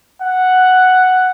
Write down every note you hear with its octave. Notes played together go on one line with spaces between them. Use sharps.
F#5